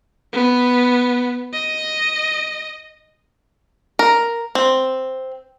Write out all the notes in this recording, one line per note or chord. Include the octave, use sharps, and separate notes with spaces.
B3
D#5
A#4
C4